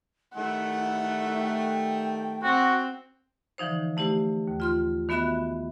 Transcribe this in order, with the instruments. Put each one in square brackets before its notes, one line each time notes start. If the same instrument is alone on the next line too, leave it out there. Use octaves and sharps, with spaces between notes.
[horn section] D#3 G3 A3 [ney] E4 [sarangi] F#5
[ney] G5
[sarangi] C4 [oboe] F#4
[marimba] D3 E3 F3 D#4 C5
A3 E4 G4 C5
D#2
F4 C6 F6
D#3 B3 F#4 E5 B5 F#6